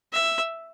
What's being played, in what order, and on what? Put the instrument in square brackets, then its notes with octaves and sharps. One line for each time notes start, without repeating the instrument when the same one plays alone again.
[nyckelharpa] E5